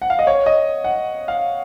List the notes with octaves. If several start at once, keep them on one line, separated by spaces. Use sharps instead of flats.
F#5
F5
D#5
C#5
D#5
F#5
F5